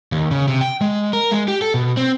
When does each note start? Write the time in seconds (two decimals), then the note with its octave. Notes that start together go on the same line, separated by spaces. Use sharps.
0.12 D#2
0.31 C#3
0.48 C3
0.61 G5
0.81 G#3
1.13 A#4
1.31 G#3
1.48 G4
1.62 A4
1.74 B2
1.97 C4